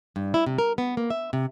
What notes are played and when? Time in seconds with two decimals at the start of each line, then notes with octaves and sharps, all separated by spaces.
0.16 G2
0.34 E4
0.46 C3
0.58 A#4
0.78 B3
0.97 A#3
1.10 E5
1.33 C3